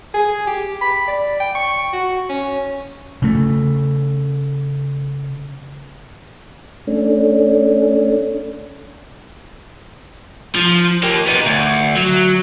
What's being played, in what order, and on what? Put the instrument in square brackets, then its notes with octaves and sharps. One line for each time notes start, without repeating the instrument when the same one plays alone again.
[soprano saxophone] G#4
G4
B5
D5
G5
C#6
F#4
C#4
[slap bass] C#3 A3
[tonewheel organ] A3 C#4 D4
[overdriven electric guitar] F3
A#3 G4
B3 D#4
D2
F#3